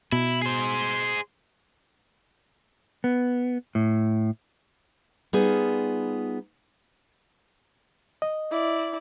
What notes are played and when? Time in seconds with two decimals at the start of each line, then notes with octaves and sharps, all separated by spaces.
0.12 B2 E4
0.42 G#4 C5
3.04 B3
3.75 A2
5.33 G3 B3 D#4 F4 G#4
8.22 D#5
8.51 E4 D5